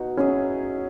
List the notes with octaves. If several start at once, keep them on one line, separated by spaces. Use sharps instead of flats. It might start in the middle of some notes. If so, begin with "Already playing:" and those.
Already playing: B2 D#4 F#4
F#3 B3 C#4 E4 G#4